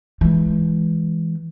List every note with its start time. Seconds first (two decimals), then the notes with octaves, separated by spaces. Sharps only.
0.21 E3 G#3